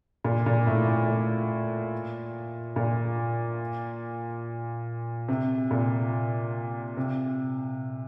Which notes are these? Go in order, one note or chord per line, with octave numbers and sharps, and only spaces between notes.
A#2
A#2
A2
A2
A#2
A#2
C3
A#2
C3